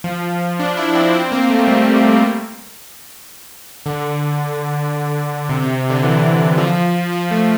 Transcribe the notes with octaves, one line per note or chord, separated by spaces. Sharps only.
F3
D4
E4
C4
C4
A#3
A3
G3
D3
C3
C3
C3
D3
E3
F3
F3
A3